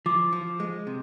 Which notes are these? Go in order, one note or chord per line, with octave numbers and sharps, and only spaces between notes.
F3 D6
F3
G#3
C3